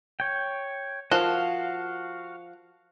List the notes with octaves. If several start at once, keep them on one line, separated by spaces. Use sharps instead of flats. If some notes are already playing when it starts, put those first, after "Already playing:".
C#5 G5
F3 F#4 A#4 F5 A5 F#6